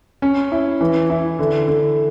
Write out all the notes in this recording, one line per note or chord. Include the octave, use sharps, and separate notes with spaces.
C#4
E4
E3
E4
D3
D3